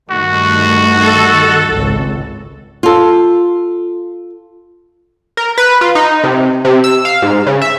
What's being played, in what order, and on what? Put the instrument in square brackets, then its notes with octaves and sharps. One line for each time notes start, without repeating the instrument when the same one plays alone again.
[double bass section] G2 D#3 A3 [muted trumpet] F#4
[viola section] A4
[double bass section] G#1 C#2
[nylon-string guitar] F4 A4
[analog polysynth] A#4
B4
F4
D#4
C3
C3
E6
F5
G#2
C#3
E5